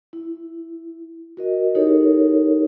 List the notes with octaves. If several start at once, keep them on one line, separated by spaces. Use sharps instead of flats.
E4
F#4 A#4 D#5
D#4 E4 G4 A4 A#4 C#5